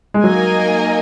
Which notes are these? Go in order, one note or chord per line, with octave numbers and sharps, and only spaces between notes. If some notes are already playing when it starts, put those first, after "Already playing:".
G#3
F#3 A#3 D#4 A#4 D#5 G#5